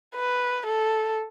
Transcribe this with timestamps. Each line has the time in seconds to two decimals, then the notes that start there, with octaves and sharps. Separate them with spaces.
0.15 B4
0.67 A4